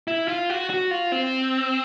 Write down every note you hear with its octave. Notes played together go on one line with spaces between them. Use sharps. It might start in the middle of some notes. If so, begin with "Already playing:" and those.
E4
F4
F#4
F#4
F4
C4